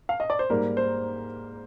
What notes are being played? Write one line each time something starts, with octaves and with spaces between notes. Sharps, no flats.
F5
D#5
D5
C5
G#2 G3 A#3 A#4
C5